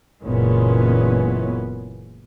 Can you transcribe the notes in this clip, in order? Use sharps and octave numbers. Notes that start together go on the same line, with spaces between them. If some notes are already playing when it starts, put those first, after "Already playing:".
F#1 A#2 E3 G#3 B3 C#4